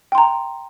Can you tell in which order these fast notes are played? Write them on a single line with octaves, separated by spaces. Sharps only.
G5 C6 A#5